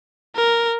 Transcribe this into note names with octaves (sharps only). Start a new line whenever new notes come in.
A#4